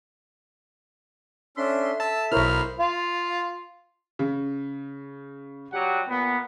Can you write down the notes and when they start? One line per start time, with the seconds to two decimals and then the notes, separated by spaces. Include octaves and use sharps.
1.57 C#4 D4 A4 E5 C6
2.00 A5 E6
2.32 B1 E4 A#4 C5 C#5 B5 F6
2.80 F4
4.19 C#3
5.72 F#3 G3 G4 F#5
6.08 A#2 B3